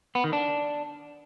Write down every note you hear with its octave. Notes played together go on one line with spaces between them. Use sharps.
B3
D#3
D4